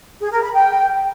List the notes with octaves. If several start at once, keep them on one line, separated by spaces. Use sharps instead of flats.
G#4
A#4
B5
G5